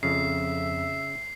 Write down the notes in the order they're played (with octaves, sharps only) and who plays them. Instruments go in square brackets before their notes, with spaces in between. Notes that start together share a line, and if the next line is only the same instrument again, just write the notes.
[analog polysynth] F2 [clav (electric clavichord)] C#3 [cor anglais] E5 [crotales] C7